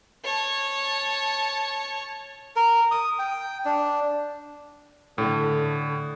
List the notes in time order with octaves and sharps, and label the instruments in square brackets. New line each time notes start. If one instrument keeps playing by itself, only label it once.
[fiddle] C#5 A5
[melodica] A#4
D#6
G5
D4
[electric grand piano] A2 [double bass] D3